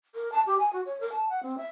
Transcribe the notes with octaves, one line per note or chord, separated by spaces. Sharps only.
A#4
A5
G4
G#5
F#4
C#5
A#4
A5
F#5
C4
E5